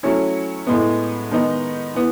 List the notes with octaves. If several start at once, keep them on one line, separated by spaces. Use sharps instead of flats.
F#3 A3 C#4 E4
A2 G#3 B3
D#3 G#3 B3 D#4
E3 B3